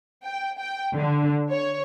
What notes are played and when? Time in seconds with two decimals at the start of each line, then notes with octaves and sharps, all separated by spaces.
0.25 G5
0.58 G5
0.96 D3
1.50 C#5